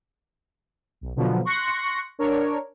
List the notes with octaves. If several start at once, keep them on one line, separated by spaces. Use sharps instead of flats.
B1
B2 D3 F3 F#3 B3
C6 C#6 F#6 A#6 C#7
D4 A#4 C#5